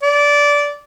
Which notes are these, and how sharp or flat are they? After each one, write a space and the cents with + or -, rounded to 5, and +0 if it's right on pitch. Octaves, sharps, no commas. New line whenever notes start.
D5 -15